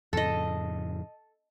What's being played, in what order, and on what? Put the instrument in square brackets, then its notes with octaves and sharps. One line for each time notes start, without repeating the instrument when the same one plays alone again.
[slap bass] F2 A2 C#3 [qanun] A4 D#5